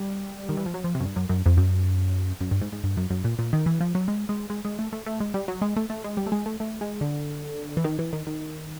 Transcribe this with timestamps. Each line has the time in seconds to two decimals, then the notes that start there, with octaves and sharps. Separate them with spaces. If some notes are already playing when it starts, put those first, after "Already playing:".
Already playing: G3
0.49 D#3
0.57 E3
0.66 F3
0.74 F#3
0.84 F3
0.95 C3
1.00 F#2
1.05 G2
1.16 F#2
1.29 F#2
1.46 F2
1.57 F#2
2.41 F#2
2.51 G2
2.61 G#2
2.72 G#2
2.84 G2
2.97 F#2
3.10 F#2
3.24 A#2
3.39 A#2
3.53 D#3
3.66 E3
3.80 F3
3.95 F#3
4.08 G#3
4.29 G#3
4.50 G#3
4.65 G#3
4.79 A3
4.93 A3
5.06 A3
5.20 G#3
5.34 G3
5.48 F#3
5.62 G#3
5.76 A3
5.90 A3
6.04 G#3
6.17 G3
6.26 A3
6.32 G#3
6.46 A3
6.60 A3
6.81 G#3
7.01 D3
7.77 E3
7.84 D#3
7.99 E3
8.13 D#3
8.27 D#3